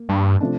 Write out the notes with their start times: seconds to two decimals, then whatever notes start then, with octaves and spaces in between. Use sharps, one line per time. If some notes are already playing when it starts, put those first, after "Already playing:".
Already playing: A#3
0.09 G2
0.41 C3 F3 A3 D4